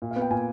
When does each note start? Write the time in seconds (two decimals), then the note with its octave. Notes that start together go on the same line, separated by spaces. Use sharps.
0.02 A#2
0.11 F5
0.16 B3
0.21 G5
0.31 A#2 G#5